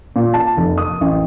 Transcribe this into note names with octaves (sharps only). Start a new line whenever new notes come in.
A#2
A5
F1
D#6
A1